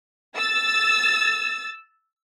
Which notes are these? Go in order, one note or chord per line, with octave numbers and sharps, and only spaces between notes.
E6 A6